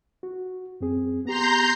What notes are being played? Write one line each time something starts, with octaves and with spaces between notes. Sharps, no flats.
F#4
F#2 C4 G#4
B3 G4 A#5 C6 G6